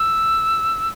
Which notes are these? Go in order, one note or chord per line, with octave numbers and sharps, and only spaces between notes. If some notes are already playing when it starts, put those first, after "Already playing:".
Already playing: E6